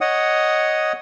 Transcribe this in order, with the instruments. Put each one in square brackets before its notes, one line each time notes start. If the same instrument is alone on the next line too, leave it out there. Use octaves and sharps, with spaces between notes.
[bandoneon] C#5 D#5 F#5 D#6